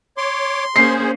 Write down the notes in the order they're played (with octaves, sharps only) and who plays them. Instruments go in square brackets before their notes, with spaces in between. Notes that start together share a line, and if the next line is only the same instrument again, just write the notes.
[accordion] C#5 D6 [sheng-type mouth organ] C6
[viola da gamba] A#3 C#4 [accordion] G#4 C5 [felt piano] C7